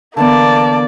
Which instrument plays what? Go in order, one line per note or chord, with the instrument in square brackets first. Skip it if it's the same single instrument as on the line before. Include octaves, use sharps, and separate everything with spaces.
[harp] D3 E3 B3 [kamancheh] A#3 D5 [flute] A5